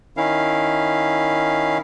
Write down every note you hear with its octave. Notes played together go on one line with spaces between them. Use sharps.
D#3 C#4 E4 F5